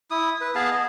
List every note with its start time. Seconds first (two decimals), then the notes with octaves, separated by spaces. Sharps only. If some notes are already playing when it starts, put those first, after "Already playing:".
0.11 E4 D#6
0.41 B4
0.55 B3 G#4 F5 A5
0.71 D#5